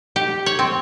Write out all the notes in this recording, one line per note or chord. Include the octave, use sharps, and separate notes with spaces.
G4
C#5
C4